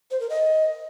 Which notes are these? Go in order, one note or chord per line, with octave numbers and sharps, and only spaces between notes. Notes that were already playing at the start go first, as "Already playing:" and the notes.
C5
A#4
D#5